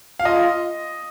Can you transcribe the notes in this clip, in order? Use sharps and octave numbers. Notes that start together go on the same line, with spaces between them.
F5
F4 D#5